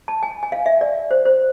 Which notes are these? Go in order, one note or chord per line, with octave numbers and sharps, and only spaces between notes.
A5
G#5
G#5
F5
E5
D5
C5
C5